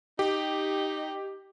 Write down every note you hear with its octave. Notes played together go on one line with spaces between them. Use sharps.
D#4 G4